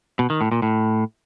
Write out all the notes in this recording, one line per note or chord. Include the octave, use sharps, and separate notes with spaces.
B2
D#3
A2
A#2
A2